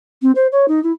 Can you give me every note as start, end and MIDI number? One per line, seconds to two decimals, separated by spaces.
0.21 0.31 60
0.35 0.46 72
0.51 0.65 73
0.68 0.82 63
0.83 0.91 64